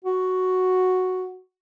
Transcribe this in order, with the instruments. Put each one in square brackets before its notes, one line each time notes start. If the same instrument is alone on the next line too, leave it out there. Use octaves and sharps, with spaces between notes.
[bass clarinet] F#4